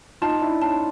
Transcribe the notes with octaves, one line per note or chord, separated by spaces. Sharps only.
D#4 F4 A5
D4 E4
C#4 D#4 A5